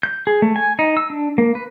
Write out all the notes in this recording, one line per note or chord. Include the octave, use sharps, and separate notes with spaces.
G6
G#4
A3
G#5
D#4
E6
D4
A#3
B4